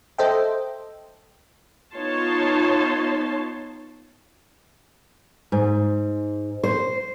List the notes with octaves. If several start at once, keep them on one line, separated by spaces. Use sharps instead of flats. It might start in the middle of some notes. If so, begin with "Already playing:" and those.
A4 C5 D#5 E5 G5
B3 D#4 F4 C#5 A5 C6
G#2
C5